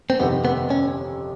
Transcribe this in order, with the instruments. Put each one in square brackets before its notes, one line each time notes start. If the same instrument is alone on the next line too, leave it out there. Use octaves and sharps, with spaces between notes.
[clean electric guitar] C4
[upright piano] G1 F2 C3 D#3 [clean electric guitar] B3
[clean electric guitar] B3
C#4